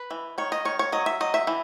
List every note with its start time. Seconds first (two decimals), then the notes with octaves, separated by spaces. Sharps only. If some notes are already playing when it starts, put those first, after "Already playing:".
Already playing: B4
0.11 E3
0.38 D#3 C#5
0.52 D#5
0.65 D#3 C#5
0.79 C#5
0.92 F#3 D#5
1.06 E5
1.20 F#3 D#5
1.34 E5
1.47 E3